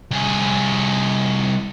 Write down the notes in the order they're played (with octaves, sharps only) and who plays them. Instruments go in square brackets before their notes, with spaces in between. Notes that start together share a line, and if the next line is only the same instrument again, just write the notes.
[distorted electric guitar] C2 G#4